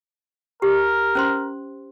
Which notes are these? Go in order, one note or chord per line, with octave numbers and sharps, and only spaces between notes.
G4 A#4
C#4 C5 C6